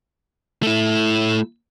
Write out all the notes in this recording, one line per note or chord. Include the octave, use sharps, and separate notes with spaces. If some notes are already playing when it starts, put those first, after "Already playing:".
A3 E4